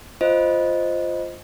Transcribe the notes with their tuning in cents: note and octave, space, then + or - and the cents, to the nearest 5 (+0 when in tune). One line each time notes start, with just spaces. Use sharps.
F4 +0 C5 +0 D#5 +0